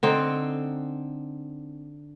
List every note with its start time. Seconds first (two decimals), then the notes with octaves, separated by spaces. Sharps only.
0.03 D3 C4 D#4